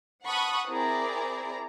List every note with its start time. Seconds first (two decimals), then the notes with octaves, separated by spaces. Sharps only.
0.24 F#5 A5 B5 C#6 D#6 F#6
0.68 C4 E4 G#4 A#4 D5 A#5